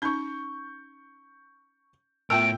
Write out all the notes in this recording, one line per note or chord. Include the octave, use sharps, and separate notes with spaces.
C#4 D#4 C#6 G6
A2 B3 F4 A#4 E5 G5 E6 D7